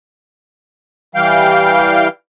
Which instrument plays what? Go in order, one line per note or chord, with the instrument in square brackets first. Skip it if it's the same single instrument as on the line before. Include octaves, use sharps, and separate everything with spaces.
[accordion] E3 G3 F5 G5